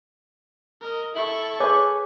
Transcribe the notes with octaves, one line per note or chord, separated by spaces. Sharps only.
A#4 D#5
E4 A4 C#6
G#4 B4 C#5 D6